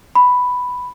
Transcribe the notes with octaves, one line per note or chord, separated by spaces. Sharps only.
B5